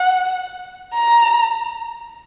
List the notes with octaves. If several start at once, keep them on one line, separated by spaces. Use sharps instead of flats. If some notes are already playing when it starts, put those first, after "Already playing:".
Already playing: F#5
A#5